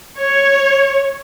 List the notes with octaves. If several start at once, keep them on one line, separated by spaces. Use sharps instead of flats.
C#5